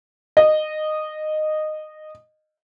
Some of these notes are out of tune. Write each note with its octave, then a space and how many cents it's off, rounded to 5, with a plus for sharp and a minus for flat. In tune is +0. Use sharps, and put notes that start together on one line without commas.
D#5 -15